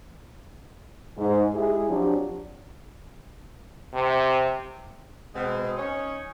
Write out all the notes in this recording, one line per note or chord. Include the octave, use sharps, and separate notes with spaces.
G#2
G#3 E4 G4 G#4
F3 F#3 C4 D4 G4
C3
B2 G#3 B3 C4
C#4 D#4 C#5